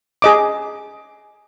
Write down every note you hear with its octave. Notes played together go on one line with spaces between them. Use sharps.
G#4 D#5 D6